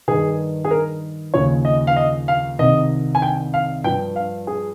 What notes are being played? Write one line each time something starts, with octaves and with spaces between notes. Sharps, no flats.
G2 D#3 G#4
G#4
A#4
D#2 C#3 F3 C#5
D#5
F5
D#5
F5
C2 C3 D#3 D#5
G#5
G5
F5
G2 F3 G5
F5
G#4